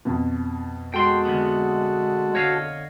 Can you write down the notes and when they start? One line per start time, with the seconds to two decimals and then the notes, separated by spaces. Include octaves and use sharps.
0.05 F2 B2
0.94 G#3 F#4 A4 G5 C6
1.25 D2 G#2 B3
2.35 D3 C#5 D#5 F5